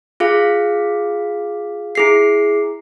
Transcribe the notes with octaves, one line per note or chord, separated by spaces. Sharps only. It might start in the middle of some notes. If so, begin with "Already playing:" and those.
F4 G#4 F5
E4 G#4 C7